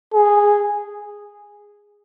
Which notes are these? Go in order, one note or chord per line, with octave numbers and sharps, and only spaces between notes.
G#4